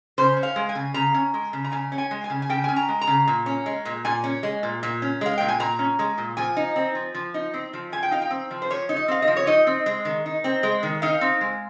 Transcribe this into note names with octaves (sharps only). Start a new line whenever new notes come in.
C#3 C5
C#4
F5
G#3
G#5
C#3
C#3 A#5
C#4
G#3
C#3
A#5
C#3 G#5
C#4
G#5
G#3
G#5
C#3
G#5
C#3 G5
C#4 G#5
A#5
G#3
A#5
C#3
A#2
C#4
G#3
A#2
A#2 G#5
C#4
G#3
A#2
A#2
C#4
G#3 F5
A#2 G5
G#5
A#2 A#5
C#4
G#3
A#2
F3 G#5
D#4
C4
F3
F3
D#4
C4
F3
F3 G#5
G5
D#4 F5
G5
C4
F3
C5
F3 C#5
D#4
D#5
C4 F5
D#5
F3
C#5
D#4 D#5
C4
G#3
D#3
D#4
C4
G#3
D#3
D#4 F5
C4
G#3